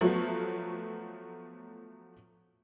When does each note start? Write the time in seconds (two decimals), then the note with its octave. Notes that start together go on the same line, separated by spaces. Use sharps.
0.01 F3 F#3 A3 B3 F4 F#4